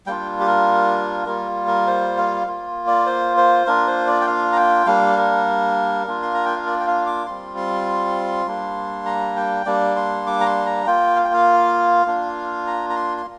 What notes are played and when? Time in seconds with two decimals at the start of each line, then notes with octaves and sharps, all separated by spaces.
0.06 G3 A#3 D4 F4 G5
0.40 G4
0.47 A#4
1.26 G3 A#3 F4 A#4
1.67 A#4
1.87 C5
2.17 F5
2.47 A#3 F4
2.87 D5
3.06 C5
3.37 C5
3.67 A#3 D4 F4 A#4
3.87 C5
4.07 D5
4.21 G5
4.27 F5
4.52 A#5
4.56 G5
4.86 G3 A#3 D4 F5
5.17 A#4
6.07 A#3 D4 F4
6.23 C6
6.34 A#5
6.45 G5
6.56 F5
6.66 D5
6.80 G5
6.87 F5
7.06 D6
7.26 G3 C4 F4 C6
7.57 C6
8.47 G3 A#3 D4
9.06 A#5
9.36 G5
9.66 G3 A#3 D4 D5
9.96 C6
10.27 D6
10.41 A#5
10.46 C6
10.66 A#5
10.86 A#3 F4 G5
11.16 F5
11.24 G5
11.34 F5
12.06 A#3 D4 F4
12.67 A#5
12.90 A#5
12.96 C6
13.17 C6